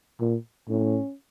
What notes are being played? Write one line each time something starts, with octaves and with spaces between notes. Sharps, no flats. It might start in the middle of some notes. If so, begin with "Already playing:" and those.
A#2
A2 C#4